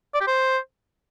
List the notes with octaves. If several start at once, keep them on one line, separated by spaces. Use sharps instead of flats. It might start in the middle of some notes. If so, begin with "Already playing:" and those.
D5
G4
C5